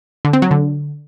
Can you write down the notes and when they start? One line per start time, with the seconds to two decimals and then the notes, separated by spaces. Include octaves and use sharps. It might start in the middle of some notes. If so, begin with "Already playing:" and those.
0.25 D3
0.33 C4
0.42 F#3
0.51 D3